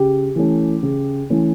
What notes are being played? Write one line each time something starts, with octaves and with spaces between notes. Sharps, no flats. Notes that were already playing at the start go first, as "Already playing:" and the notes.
Already playing: C#3 G4
E3 A3 C#4
C#3
E3 A3 C#4